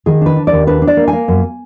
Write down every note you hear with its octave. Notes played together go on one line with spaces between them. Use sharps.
D#3 G#4
D4 B4
D4
D#2 D5
D4 B4
D4
D5
A#3
G#5
A#3
F#2